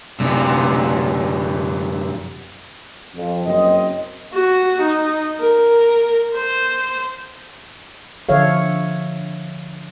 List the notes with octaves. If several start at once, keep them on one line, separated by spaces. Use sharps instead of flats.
F#2 C3
F2
F#1 F#2 C4 D#5
F#4
D#4
A#4
C5
D3 F3 A4 C#5 E5 F5